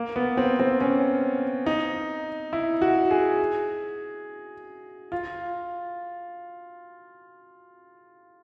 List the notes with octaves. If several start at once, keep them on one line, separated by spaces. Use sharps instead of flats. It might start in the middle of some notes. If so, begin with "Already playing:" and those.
Already playing: A#3
B3
C4
C4
C#4
D#4
E4
F#4
G#4
F4